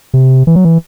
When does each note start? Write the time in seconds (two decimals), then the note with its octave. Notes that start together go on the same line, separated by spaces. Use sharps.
0.14 C3
0.47 E3
0.56 F#3
0.65 E3